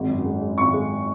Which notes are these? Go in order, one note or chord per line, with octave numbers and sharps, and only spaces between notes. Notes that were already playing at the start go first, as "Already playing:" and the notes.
Already playing: G#1 G#3
F#2
G#3
G#3
G#1 C#6
G#3